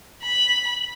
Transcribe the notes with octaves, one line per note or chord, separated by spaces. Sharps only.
B5